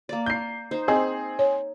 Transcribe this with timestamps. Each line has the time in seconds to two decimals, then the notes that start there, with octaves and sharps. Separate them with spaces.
0.09 A#3 D5
0.26 G6 C7
0.71 D#4 C5
0.88 C4 G#4 D#5
1.39 C#5